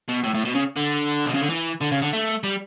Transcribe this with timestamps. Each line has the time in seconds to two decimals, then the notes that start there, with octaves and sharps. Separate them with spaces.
0.08 B2
0.24 A2
0.34 A2
0.45 B2
0.55 C#3
0.77 D3
1.26 B2
1.34 C#3
1.42 D3
1.49 E3
1.81 D3
1.92 C#3
2.02 D3
2.13 A3
2.43 G3